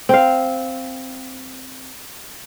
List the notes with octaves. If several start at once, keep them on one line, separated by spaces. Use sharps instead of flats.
C4 F5